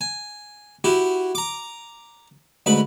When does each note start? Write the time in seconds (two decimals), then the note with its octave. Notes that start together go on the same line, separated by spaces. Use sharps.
0.01 G#5
0.84 E4 F#4 G4
1.35 A#5 D6
2.66 D2 G#2 B4 B5